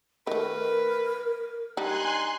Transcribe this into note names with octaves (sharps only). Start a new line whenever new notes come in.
D#3 A3 A#4 B4
G3 D4 D#4 G#5 C6 F#6